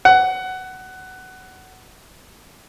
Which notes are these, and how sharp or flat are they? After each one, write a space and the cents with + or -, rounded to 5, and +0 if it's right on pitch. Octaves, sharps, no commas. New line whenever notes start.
F#5 +15